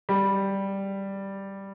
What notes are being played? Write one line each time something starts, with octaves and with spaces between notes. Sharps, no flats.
G3